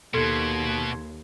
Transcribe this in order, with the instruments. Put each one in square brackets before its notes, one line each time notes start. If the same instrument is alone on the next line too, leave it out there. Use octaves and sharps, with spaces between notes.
[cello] D#2 [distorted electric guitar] B2 [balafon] A4 [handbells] C6 G#6